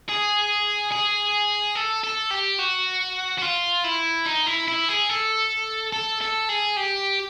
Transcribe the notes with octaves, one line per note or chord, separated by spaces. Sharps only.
G#4
G#4
A4
A4
G4
F#4
F#4
F4
E4
D#4
E4
E4
G#4
A4
A4
A4
G#4
G4